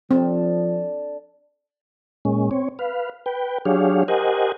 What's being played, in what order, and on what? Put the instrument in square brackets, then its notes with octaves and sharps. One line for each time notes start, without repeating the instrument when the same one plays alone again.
[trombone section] F3 [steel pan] C4 [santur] D4 A4
[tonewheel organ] A#2 G#3 C#4
C4 C#5
B4 F5
B4 G5
F#3 D4 G4 G#4 C#5 F5
G4 A#4 C5 D#5 F#5 G#5